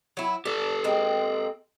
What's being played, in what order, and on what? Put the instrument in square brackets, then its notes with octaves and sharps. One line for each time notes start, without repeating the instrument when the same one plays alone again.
[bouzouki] F#3 E4
[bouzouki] D4 [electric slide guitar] G4 A4
[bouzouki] G#3 A#3 C4